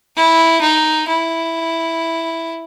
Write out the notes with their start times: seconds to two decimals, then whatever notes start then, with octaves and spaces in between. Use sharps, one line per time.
0.16 E4
0.61 D#4
1.08 E4